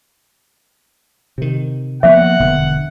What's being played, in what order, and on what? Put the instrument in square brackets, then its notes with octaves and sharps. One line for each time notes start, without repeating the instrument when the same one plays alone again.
[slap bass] C3 D#3
[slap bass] F3 A#3 B3 [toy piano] E5 [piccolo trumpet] F#5
[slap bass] E1 D3 B3